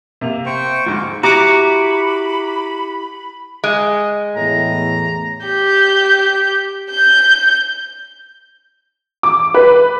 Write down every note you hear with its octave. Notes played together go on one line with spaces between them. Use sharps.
C3 A#3 F7
C5 G5 C#6
D2 G#2 F3
E4 F#4 G4 A#5 B5 D6
G#3
E2 A2 A#5
G4 G6
G6
D6
B4